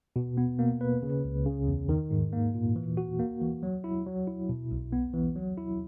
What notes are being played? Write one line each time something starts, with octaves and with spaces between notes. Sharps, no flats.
B2
B3
A#3
B4
C#3
C#2
C#3
E2
D#3
G#2
A#3
A#2
E3
F#4
A#3
E3
F#3
E4
F#3
E4
B2
B1
B3
E3
F#3
E4